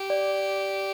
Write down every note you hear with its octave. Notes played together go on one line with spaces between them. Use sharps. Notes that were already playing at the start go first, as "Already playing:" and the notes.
Already playing: G4
D5